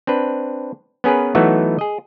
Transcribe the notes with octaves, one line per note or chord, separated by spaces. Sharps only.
C4 D4 B4
B3 C#4 G#4 A#4 B4
E3 F#3 A3 B3 D#4 F#4
G#4 D#5